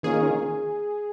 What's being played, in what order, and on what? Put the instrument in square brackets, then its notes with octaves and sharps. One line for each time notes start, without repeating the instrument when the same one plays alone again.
[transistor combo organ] D#3 A#3 C#4 F4 [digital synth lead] G#4